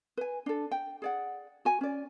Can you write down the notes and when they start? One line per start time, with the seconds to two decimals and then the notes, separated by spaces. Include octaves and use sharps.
0.17 B4 G#5
0.46 D4 A4
0.71 G5
1.02 G#4 D5 F#5
1.65 F#4 G#5
1.81 C#4 D5